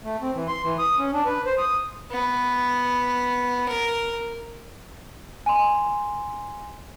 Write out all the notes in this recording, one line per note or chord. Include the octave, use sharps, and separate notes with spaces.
A3
C4
E3
C6
E3
D#6
C#4
D4
B4
C5
D#6
B3
A#4
G#5 C6